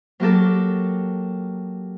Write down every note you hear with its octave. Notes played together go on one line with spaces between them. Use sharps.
F#3 A#3 G4 A4